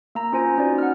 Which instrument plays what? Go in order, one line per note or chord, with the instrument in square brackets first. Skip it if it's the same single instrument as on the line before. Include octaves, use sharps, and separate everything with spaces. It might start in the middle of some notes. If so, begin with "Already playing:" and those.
[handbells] A#3 A#5
C#4 F4 C5 G#5
C#4 D#4 F#4 B4 D5
F#5 F6